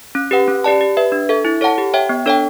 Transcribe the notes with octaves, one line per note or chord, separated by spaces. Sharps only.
C#4
G4 B4 F#5
C#4
G4 D5 A5
G4
B4 E5
D4
A4 E5
E4
A4 C#5 F#5 A5
G4
C#5 E5 G5
B3
D4 A4 C#5 G5